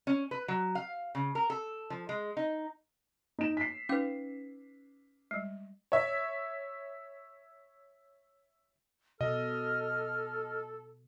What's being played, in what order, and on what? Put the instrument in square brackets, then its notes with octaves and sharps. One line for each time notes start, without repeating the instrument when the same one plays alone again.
[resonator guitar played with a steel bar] C#4
B4
F#3
F5
C#3
A#4
A4
F3
G#3
D#4
[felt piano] D#4 E7
B6 C7
[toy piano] C#4 B4 [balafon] D#4 F5 D6
[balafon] G3 G#3
[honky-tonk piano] C#5 E5
[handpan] B2 [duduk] A4 [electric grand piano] D#5 [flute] F6